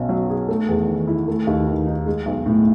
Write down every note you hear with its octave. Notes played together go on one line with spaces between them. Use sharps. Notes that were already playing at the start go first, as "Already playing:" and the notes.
Already playing: B1 B2 C#4
F#3
G#4
A3
E2
D#3
E4
A3
D#2
D#3
D#4
G#3
B1
A2